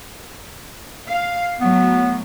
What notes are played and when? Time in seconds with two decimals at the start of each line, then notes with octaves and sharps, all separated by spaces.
1.08 F5
1.61 A2 F#3 B3